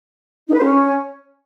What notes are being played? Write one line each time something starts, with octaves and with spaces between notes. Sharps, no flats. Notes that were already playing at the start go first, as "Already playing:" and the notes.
D#4
B4
C5
C#4